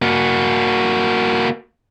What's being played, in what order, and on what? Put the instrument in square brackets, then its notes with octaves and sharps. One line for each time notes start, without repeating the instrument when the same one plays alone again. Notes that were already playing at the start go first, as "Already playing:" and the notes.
[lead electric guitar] A#3 F#4